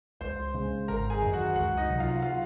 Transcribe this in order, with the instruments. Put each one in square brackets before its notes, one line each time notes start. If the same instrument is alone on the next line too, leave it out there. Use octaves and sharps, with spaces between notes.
[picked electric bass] C#2 [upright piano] C5 C6
[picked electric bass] C#3 G#3 C#4
[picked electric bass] G#1 [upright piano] A#4 A#5
[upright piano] G#4 G#5
[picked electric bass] F#2 D#3
[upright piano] F#4 F#5
[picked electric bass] C#2 [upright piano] F#4 F#5
[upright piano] D#4 D#5
[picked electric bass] C3 F#3
[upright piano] F4 F5
F#5
F4 F5